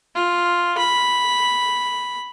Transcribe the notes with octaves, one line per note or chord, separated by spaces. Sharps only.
F4
B5